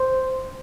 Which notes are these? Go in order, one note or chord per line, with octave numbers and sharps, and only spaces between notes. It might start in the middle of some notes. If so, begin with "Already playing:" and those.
Already playing: C5